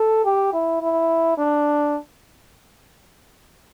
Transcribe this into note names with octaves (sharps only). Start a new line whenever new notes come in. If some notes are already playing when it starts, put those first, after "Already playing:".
Already playing: A4
G4
E4
E4
D4